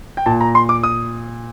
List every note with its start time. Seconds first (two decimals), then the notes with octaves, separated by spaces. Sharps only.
0.17 G5
0.26 A#2 A5
0.41 A#5
0.55 C6
0.69 D6
0.83 D#6